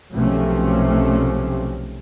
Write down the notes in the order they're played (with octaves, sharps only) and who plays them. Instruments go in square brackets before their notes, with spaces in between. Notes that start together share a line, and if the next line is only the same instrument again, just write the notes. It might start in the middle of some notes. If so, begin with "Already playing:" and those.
[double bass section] B1 C3 D#3 F3 A3 C#4